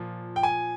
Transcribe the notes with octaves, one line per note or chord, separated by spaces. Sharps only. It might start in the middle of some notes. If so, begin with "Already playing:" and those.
Already playing: A#2 F3
G5
G#5